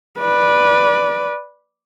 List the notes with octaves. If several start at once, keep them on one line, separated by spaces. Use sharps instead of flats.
B4 D5